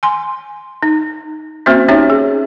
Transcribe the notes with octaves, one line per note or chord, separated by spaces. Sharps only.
G#5 C6
D#4
A#3 C4 C#4 F#4 C5 E5
C#4 D#4 G4 C#5 E5
G#4